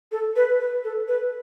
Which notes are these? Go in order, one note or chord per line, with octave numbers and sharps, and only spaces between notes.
A4
B4
B4
A4
B4